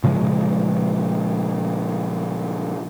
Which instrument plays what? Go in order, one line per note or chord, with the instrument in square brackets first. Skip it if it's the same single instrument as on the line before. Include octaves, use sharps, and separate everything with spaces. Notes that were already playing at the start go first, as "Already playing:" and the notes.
[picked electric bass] A#2 C#3 F3 G#3